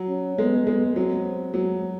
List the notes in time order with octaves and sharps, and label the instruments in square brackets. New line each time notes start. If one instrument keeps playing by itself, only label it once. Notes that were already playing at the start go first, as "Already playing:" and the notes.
Already playing: [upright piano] F#3
[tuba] C#4
[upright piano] G#3 [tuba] B3
[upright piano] G#3 [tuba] B3
[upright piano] F#3 [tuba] C4
[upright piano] F#3 [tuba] G#3